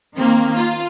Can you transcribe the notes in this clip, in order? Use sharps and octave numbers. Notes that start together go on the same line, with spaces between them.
D#3 A#3 C4
F4